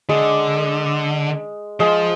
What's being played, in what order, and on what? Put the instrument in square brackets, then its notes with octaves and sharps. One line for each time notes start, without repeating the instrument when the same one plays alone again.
[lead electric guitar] D3 [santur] G#3
[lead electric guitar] F3 [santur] G#3